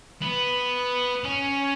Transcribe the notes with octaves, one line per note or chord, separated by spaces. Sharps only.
B3
C#4